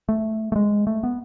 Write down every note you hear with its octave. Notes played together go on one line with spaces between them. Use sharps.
A3
A3
G#3
A3
B3